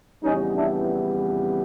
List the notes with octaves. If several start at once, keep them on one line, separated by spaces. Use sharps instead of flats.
F2 C#3 E3 G3 B3 C#4 D#4
D4 E4